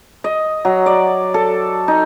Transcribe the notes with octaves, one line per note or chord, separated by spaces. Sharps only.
D#5
F#3
D5
A4
D#4